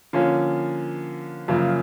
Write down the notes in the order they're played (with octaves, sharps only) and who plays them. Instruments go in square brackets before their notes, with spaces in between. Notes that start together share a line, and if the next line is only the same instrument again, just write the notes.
[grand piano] D3 F3 A#3 C#4 F4
F#2 C#3 F3 A#3